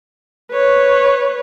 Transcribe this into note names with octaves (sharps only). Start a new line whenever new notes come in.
B4 C#5